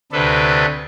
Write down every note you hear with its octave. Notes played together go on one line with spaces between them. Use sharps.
D2 C3 D4 A4 B4